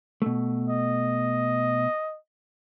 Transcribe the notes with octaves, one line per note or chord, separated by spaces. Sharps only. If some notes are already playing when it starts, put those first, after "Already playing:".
B2 A3
D#5